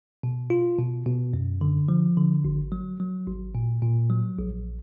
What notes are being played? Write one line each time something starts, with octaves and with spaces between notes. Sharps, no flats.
B2
F4
B2
B2
F#2
D3
F3
D3
G#1
F#3
F#3
G#1
A#2
A#2
F#3
A#1